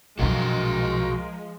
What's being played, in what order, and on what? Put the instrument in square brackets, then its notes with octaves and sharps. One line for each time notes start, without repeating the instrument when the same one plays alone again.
[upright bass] B1 F#2 [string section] F3 G#3 [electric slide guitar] F#4 D#5 F5 [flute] A#4